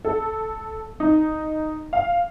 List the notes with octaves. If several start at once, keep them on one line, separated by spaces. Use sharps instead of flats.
A4
D#4
F5